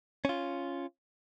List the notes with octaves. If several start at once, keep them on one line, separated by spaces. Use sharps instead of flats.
C#4 F4